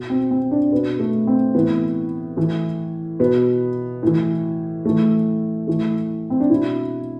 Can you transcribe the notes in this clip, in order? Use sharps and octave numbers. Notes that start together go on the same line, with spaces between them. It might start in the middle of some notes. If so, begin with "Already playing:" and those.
Already playing: B2
C4
C4
D4
B2 B3
A3
C4
A2 E3 B3
A2 E3
B2 B3
A2 E3
A2 E3 A3
A2 E3 A3
C4
D4
B2 E4